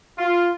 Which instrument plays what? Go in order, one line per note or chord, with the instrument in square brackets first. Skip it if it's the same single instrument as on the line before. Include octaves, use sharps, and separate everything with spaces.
[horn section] F4